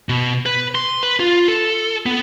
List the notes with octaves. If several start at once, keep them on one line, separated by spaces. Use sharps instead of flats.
B2
B4
C6
B4
F4
A4
B3